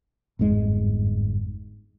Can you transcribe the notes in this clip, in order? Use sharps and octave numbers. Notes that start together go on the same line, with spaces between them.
G1 F2 G#2 G#3